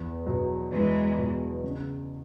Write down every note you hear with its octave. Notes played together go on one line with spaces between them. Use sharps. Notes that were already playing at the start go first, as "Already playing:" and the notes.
Already playing: E2
B2 F#3
E2 E3 G#3
B2 F#3
C#3